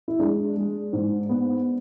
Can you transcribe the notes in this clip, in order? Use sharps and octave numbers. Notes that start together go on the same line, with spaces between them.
E4
G#3 D4
G#3
G#2
B3